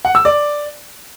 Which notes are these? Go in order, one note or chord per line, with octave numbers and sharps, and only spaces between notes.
F#5
E6
D5